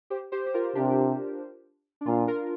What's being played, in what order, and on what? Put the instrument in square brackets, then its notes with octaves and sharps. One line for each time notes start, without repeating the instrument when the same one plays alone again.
[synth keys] G4 C5
G4 C5
G4
F4 A#4
[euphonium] C3 [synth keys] D4 G4
[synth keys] D4
[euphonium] A#2 [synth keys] F4
[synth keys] F4 A#4